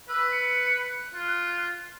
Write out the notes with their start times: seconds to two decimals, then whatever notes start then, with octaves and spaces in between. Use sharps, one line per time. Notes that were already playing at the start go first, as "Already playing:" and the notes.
0.09 B4 E6
0.32 C#7
0.77 F#6
1.15 F4